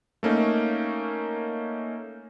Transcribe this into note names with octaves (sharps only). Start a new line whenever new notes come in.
A3 A#3 C#4 D#4